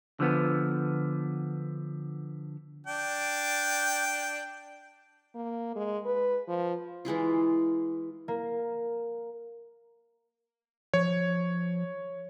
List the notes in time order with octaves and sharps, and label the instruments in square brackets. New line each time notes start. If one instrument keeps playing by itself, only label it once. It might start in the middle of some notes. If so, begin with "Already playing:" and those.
[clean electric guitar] D3 F3 B3
[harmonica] D4 G5
[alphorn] A#3
G#3
B4
F3
[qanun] E3 G#3 E4 F4
[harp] A#3
[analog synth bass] F3 [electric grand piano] C#5